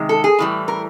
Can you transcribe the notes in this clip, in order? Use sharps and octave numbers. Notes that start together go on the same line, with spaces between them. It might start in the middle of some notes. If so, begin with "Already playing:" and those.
Already playing: C3 D#3 G#3
A4
G#4
A2 E3 G3
A#4